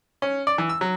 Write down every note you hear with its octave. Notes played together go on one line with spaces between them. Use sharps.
C#4
D5
E3
E6
F#3